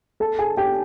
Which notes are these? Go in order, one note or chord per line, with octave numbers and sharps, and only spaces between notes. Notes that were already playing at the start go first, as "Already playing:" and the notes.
A4 A5
G#4 G#5
G4 G5